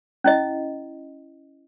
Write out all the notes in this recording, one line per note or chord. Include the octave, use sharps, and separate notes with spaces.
C#4 E4 D#5